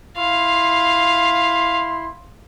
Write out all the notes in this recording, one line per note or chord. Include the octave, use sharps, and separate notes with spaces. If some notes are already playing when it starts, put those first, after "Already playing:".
E4 F5 C6